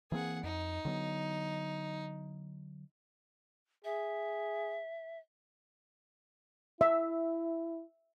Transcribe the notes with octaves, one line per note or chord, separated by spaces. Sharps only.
E3 A#3 C4 G#4 F#5
F2 D#4
D3 F#3 B3
G#4 E5
E4 E5